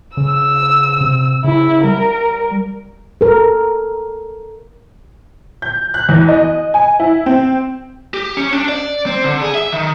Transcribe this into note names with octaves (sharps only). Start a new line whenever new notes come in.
C#3 E6
C3
C#3 E4
G3 A#4
A4 A#4
G6
F#6
E2
D#5
G#5
E4
C4
G4
C#4
D4
D5
C4
D3
G#4
E5
D#3